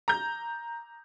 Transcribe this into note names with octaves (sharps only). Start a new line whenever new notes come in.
A#5 G6